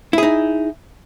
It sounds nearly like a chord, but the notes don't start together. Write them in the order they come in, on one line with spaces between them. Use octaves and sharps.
E4 G#4 D#4